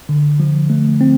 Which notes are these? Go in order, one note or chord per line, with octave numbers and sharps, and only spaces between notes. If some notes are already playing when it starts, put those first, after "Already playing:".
D3
F3
A3
C4